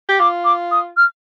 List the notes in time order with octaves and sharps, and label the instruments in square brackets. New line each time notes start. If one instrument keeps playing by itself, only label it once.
[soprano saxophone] G4
[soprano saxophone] F4 [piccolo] D6
[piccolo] D6
D#6
F6